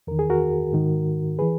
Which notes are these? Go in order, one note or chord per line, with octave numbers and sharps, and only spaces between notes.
E2 D#3 A#4
G#4
F#4 A#4
G#2 D#3
E3 G#4 B4